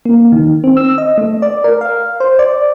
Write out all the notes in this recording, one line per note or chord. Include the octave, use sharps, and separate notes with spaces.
A#3
D#3
C4
E6
D#5
A3
D5
A#4
F5
C5
D5